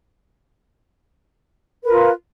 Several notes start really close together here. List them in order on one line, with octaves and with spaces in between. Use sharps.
B4 A#4 F4